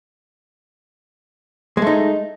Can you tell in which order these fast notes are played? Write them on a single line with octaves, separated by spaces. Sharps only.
G#3 A3 D#4